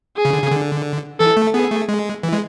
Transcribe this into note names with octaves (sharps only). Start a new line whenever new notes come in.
G#4
C#3
D3
C#3
D3
E3 A4
A3
B3 G#4
A3
G#3
E3
G#3